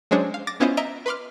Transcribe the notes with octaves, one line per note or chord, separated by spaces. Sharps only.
F#3 G#3 C#4 D4 C5 C#5
F5
D6 A6 A#6
B3 C#4 E4 F4 C5 D#5
D#5 E5 A#5 D7
B4 B5 C6 D6 F6